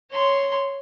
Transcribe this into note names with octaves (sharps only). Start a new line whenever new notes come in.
C#5 C6